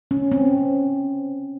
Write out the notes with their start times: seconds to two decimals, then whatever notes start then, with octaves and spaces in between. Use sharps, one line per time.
0.11 C#4
0.32 C4